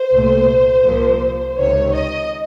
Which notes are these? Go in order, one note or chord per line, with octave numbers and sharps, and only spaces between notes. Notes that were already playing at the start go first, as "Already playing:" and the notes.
Already playing: C5
C2 A#2 A3
C2 A#2 F3 A#3
C#2 C3 D#3 C#5
D#5